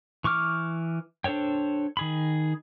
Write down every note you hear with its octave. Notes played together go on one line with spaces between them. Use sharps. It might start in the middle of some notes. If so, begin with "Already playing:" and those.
E3 C#6 D6 F6
D4 A4 C5 C#5 G5
D#3 G#4 B5